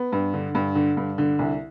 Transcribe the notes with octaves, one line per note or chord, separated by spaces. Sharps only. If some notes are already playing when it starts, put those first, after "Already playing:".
Already playing: B3
G2
D3
G2
D3
G2
D3
C2